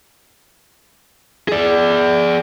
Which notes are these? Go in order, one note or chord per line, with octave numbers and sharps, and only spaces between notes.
G#4 D5